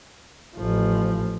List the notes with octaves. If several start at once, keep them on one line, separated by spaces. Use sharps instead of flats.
A1 F3